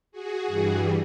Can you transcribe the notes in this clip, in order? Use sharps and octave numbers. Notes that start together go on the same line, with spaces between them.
F#4 G#4
G2 E3 G3